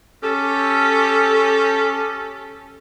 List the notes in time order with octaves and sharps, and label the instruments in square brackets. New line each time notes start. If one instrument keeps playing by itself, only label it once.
[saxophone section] C#4 G4 A4